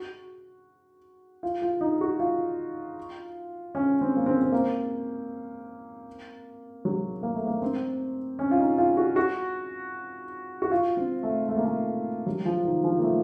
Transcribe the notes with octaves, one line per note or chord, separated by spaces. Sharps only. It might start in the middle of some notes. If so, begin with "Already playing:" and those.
Already playing: F#4
F4
F4
D#4
F#4
F4
C#4
C4
A#3
C4
C4
A#3
F#3
A#3
A3
A#3
C4
C#4
F4
D#4
F4
F#4
F#4
F#4
F4
C4
A3
A3
A#3
A3
F#3
F3
D#3
F3
A#3
A3